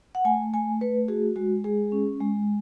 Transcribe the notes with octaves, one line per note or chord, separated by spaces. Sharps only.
F#5
A3 G#5
A3 G#5
A3 B4
F#4 G#4
G#3 F#4
G#3 G#4
C#4
G#3